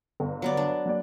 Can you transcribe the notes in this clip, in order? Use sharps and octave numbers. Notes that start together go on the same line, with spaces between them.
G1
F#3 B3 D5
D4
F#3 A#3 D5